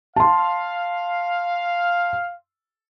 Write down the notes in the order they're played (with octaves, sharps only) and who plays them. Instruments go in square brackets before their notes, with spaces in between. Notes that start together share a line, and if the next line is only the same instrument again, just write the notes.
[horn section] F5 [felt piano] A5 C6